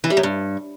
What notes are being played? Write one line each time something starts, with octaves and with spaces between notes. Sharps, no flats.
E3
G3
F#2
G2